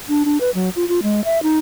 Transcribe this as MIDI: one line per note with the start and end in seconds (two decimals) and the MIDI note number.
0.09 0.23 62
0.25 0.38 62
0.41 0.50 71
0.55 0.70 54
0.76 0.88 65
0.88 1.00 65
1.03 1.24 56
1.25 1.41 76
1.43 1.58 63